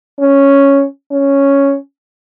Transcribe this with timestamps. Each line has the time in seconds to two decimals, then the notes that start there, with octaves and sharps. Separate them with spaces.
0.20 C#4
1.12 C#4